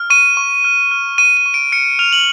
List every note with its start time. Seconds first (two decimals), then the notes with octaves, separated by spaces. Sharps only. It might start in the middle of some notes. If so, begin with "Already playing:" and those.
Already playing: F6
0.10 C#6 D#7
0.37 C#6
0.64 F6
0.91 F6
1.18 C#6 D#7
1.37 D#7
1.46 C#6
1.54 D7
1.72 F6 C#7
1.99 F6 F7
2.12 F#7